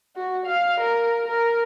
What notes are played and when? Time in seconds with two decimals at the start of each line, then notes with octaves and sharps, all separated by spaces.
0.16 F#4
0.46 F5
0.80 A#4
1.28 A#4